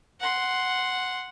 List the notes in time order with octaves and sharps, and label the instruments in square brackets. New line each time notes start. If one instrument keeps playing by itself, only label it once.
[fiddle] F#5 C6